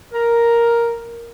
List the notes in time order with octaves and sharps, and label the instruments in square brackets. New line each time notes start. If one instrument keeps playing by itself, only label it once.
[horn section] A#4